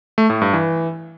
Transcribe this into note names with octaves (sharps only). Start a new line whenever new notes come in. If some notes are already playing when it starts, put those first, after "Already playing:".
A3
A2
G2
E3